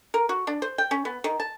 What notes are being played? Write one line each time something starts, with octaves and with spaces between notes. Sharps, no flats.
A#4
F#4
D4
C5
G5
C#4
B3
D#3
A5